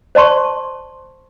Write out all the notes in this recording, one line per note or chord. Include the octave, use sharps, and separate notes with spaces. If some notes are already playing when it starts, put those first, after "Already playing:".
C5 D5 A5 C6 C#6